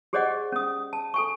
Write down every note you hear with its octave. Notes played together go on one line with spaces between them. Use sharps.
G4 G#4 C5 D5 D#5 F#5
C#4 D#6
A5
A4 G#5 C#6